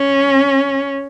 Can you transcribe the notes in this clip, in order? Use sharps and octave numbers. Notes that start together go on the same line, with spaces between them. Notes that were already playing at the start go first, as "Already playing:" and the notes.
Already playing: C#4